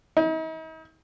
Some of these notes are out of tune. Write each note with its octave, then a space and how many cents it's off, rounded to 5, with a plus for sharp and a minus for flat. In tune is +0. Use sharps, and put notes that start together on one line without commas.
D#4 +45